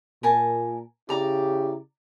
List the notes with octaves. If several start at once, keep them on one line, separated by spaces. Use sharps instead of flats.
A#2 A#4 G#5 A5
C#3 E4 G4 D5 A#5 D6